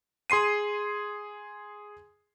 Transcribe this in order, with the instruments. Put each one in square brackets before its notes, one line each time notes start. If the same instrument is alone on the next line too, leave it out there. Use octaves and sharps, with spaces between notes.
[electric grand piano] G#4 C6 C7 D#7